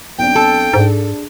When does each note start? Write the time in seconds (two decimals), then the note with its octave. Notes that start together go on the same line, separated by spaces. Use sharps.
0.18 B1 C4 D4 G5
0.35 A4
0.73 G#2 D4 G#4